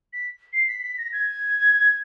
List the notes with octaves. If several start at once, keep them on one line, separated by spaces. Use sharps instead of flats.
B6
C7
B6
B6
A#6
G#6